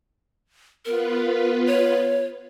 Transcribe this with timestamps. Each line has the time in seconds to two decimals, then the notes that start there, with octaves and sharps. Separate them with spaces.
0.85 B3 F4 A#4 B4
1.67 C#5